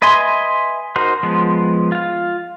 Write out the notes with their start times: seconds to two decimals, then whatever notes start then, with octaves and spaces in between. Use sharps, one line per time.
0.02 B4 D#5 E5 G#5 C6
0.96 D#4 F#4 A#4 C5
1.23 F3 G#3 B3
1.92 F4 F5